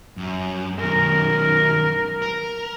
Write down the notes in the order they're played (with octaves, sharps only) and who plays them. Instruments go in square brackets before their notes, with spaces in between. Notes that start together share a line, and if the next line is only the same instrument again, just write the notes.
[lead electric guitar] F#2
[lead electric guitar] F#2 D#3 [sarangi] A#4
[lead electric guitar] A#4